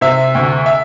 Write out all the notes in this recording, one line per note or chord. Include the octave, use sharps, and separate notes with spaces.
C3 E5
D2
E5